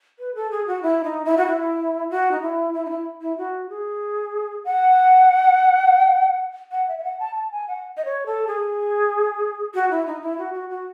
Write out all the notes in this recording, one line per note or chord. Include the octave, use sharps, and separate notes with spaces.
B4
A4
G#4
F#4
E4
D#4
E4
F#4
E4
F#4
D#4
E4
E4
D#4
E4
E4
F#4
G#4
F#5
F#5
E5
E5
F#5
A5
A5
G#5
F#5
D#5
C#5
A4
G#4
F#4
E4
D#4
E4
F#4
F#4
F#4